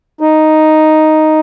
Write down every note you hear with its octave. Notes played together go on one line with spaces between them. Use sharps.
D#4